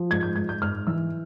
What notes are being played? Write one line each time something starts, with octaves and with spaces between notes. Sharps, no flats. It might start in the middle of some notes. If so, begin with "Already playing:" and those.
Already playing: F3
G#2 G#6
G6
G#2 G#6
G6
G#2 F6
E3 E6